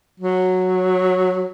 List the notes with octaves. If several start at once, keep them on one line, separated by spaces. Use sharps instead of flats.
F#3